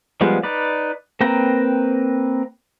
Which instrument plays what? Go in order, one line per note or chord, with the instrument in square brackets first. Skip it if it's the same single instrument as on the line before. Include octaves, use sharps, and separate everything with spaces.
[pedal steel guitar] F3 G3 G#3 B3 C5
D#4 B4 D5
A#3 C4 B4 G5 A#5